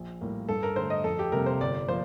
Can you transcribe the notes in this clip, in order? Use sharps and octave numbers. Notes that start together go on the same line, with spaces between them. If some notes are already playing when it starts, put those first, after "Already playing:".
Already playing: A#1
A2 G3 A#3
G2 A4
A#4
D3 A3 C5
D#5
F2 A4
G4
C3 G3 A#3 A#4
C5
G1 D5
F3 A#3 C5